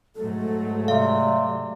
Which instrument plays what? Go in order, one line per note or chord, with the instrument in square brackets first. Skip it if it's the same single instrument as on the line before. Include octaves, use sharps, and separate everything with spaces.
[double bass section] G#2 F#3 A3 [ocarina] A4
[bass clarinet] C3 [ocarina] D5 [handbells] F5